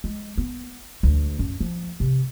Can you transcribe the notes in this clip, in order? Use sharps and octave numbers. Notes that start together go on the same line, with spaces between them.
G#3
B3
D2
F#2
F3
C3